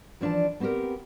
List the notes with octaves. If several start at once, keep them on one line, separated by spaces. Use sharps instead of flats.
E3 F3 D4 D5 A5
B3 C4 F#4 G4 A#4